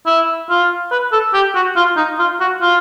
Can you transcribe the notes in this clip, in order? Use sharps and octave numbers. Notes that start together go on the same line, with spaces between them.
E4
F4
B4
A4
G4
F#4
F4
D#4
F4
F#4
F4